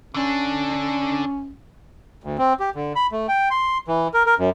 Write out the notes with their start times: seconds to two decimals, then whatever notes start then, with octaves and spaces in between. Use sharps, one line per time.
0.14 D3 C#4 D4
2.24 D2
2.38 C4
2.60 G4
2.75 D3
2.96 B5
3.12 A3
3.28 G5
3.51 C6
3.88 E3
4.14 A#4
4.26 A#4
4.38 F#2